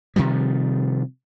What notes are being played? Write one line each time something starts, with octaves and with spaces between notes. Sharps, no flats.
C3 D#3 F3 G3